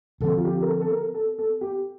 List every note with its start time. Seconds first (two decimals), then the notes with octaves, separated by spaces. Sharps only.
0.21 D2 D3 F3 C4 A4
0.37 F4
0.45 G4
0.62 A#4
0.68 A4
0.81 A4
0.91 A#4
1.14 A4
1.39 A4
1.61 G4